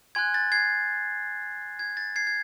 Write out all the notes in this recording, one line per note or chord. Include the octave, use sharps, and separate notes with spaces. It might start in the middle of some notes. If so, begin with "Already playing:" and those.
G#5 C6 F#6 G#6
A6
G#6 C7
G#6
A6
G#6 C7
G#6